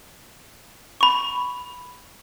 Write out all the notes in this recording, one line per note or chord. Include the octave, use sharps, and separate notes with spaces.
B5 C#6